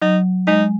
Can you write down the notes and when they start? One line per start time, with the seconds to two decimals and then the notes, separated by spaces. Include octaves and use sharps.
0.01 F#3 D#4
0.47 G#3 D#4